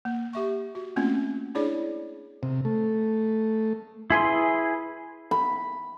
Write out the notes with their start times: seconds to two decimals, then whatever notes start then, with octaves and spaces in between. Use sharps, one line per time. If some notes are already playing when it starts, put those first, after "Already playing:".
0.05 A#3
0.33 G4 E5 C#6
0.75 F#4
0.96 A3 A#3 C4 C#4 F4
1.55 D4 E4 G#4 C#5 D5
2.43 C3
2.65 A3
4.10 E4 G#4 B4 C6
5.31 B5